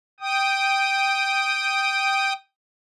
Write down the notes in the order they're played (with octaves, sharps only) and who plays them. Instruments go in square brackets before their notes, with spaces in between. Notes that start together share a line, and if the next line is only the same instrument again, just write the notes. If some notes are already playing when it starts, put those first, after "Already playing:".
[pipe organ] G5 D#6